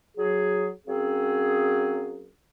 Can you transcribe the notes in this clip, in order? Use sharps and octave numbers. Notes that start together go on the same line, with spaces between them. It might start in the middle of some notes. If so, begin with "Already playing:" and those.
F#3 G#4
F#3 A#3 C4 C#4 G#4